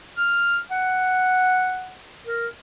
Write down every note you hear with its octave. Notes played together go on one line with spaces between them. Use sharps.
F6
F#5
A#4